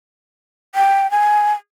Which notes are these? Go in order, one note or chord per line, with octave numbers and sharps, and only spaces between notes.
G5
G#5